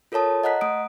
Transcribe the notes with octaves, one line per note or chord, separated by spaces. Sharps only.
F4 A4 A#4 C#5 A5 D#6
D#5 F#5 A#5 F#6 B6
A3 D#6 D7